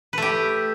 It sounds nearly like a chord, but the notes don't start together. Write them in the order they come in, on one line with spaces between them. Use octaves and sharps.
B4 A3 G4